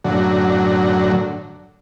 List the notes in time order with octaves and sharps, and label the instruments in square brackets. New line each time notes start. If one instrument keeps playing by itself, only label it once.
[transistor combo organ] F#2 A2 D3 F#3